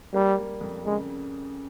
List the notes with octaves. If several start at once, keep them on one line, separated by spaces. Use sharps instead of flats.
G3 A#3
G3
F2
C#3 G#3